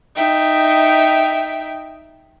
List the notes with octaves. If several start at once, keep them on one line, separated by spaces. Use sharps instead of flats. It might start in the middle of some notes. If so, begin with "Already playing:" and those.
D#4 E5 G5